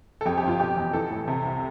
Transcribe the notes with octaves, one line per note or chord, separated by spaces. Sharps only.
A4
F2 G4
G4
G1
F4
B2 G4
E2
E3 A4
A2
C3
C2